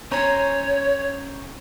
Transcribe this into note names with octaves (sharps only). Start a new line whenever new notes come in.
C#4 C5 C#5 A#5